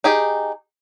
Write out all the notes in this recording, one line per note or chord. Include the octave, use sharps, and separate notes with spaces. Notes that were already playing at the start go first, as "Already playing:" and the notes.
D#4 G4 G#4